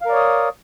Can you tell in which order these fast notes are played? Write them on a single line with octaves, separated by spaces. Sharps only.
F5 A#4 D5 C#5 D#6